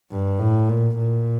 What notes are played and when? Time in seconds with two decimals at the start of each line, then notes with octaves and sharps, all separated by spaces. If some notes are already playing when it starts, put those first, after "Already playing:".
0.11 G2
0.39 A2
0.69 A#2
0.98 A#2